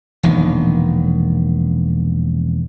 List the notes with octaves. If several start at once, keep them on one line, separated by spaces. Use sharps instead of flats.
E1 A#1 D#3